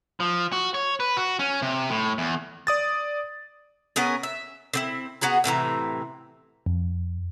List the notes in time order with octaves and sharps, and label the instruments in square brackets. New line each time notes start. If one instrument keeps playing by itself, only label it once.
[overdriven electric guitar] F3
F#4
C#5
B4
F#4
C#4
C3
A2
E2
[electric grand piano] D5 D#6 A6
[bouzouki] B3 C#4 G#4 A#4
E5
D3 C4 E4
B3 F#4 G#4 A#5
A2 C3 E3 A#5
[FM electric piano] F2